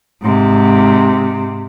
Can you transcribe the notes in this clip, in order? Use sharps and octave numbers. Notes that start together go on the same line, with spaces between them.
G#2 C3